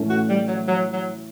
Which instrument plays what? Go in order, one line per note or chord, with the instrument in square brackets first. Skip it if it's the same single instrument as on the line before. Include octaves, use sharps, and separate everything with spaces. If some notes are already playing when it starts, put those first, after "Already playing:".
Already playing: [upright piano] A2 E3 A3 C#4 E4
[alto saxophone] F#4
G3
F#3
F#3
F#3